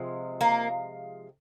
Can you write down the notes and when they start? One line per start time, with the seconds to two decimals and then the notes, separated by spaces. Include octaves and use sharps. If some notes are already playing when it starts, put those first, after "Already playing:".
Already playing: C3 F3 G#3
0.41 A#3